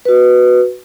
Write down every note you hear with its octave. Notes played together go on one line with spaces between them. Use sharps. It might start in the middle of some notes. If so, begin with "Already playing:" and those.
F#4 B4